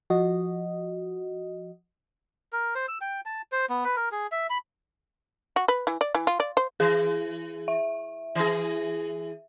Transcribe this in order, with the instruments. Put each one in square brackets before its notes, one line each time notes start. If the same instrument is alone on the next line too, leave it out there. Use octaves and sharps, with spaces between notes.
[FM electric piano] F3 F#4 D#5
[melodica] A#4
C5
E6
G5
A5
C5
B3
B4
A#4
G#4
E5
B5
[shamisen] F#4
B4
E3
D5
E3
F4
D5
C5
[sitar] E3 [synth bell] G#4
[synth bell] E5
[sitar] E3 G#4